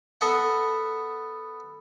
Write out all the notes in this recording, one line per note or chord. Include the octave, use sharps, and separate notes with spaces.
B3 A4 D#5 E5 F#5